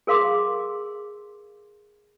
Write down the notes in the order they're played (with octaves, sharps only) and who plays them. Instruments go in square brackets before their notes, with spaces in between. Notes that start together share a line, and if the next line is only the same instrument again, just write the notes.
[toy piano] G#4 A#4 F5 C6 D6